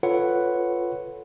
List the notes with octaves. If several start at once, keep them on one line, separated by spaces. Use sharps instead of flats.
F4 A4 B4 C#5 F#5